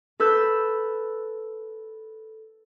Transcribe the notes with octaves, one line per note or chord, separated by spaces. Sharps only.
A4 B4 E6 G6